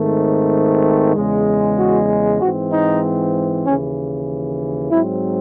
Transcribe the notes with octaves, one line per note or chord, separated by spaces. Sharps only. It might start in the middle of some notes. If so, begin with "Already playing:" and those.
Already playing: G#2 D#3 A3 C4
E2 C#3 G#3
F#4
G#2 E3 C4 F#4
D#4
D#2 C#3 E3 C#4
G#2 F#3 C4 E4